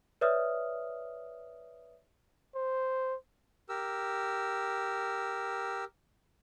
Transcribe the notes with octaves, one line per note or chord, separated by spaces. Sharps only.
B4 C#5 D5 E5 D#6 F6
C5
G4 A#4 E6